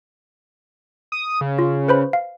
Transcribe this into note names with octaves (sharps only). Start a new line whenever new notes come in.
D#6
C#3
F4
B4 C5 B5
F5